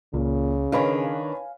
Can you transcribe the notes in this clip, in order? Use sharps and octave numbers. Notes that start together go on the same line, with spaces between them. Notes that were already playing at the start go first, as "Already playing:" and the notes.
C#2 A#2 C#3
D#3 D4 B4 C#5 F5 G#5 B5